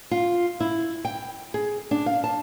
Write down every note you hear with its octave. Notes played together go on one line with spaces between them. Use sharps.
F4
E4
G5
G#4
D4
F5
A5